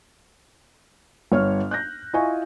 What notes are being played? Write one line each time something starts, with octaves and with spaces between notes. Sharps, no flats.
G1 C#5 F6
F#6 G6 A#6
E4 F4 D#5 G#5 C#6